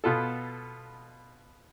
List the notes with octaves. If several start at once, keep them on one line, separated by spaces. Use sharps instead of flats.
B2 B3 F4 A4